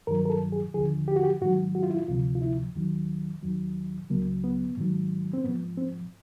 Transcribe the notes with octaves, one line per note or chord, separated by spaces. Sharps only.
G2 D#3 F#3 A#4
A#4
A4
G#4
D#2 D3 F3 G#4
G4
F#4
G4
G#2 D#3 F#3 F#4
F#4
F4
E4
F4
D2 C3 F3 F4
F4
E4
D#2 D#3 F#3
D#2 D#3 F#3
C#2 C#3 F#3 A#3
B3
G#2 D#3 F#3
C4
G#2 F3 B3
C4